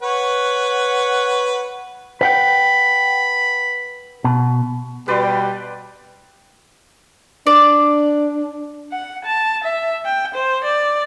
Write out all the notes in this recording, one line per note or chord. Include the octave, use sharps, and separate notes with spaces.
B4 C#5 F#5
B4 F#5 G5 B5
B2
B2 G3 G4 B4 D5 C6
D4 D5
F#5
A5
E5
G5
C5
D5